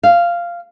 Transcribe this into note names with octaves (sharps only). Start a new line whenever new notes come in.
F5